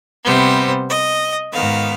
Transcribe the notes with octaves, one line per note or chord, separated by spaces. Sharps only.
C3 G3 B3 C5
D#5
G#2 D#3 B3 F5